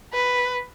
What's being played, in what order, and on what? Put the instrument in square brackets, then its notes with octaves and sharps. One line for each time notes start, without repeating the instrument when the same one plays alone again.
[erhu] B4